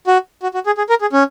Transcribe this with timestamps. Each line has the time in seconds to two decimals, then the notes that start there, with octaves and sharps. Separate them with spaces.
0.07 F#4
0.43 F#4
0.54 F#4
0.66 G#4
0.78 G#4
0.90 A#4
1.01 G#4
1.13 C#4